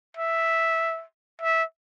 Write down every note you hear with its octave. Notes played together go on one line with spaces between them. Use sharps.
E5
E5